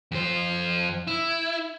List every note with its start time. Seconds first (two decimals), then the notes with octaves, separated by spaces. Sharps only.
0.11 F2 C5
1.07 E4